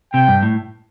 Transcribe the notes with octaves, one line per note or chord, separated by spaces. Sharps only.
C3 G5
G2
A2